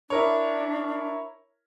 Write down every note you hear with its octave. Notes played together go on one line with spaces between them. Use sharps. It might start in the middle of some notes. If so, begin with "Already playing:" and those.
D4 E4 A#4 C#5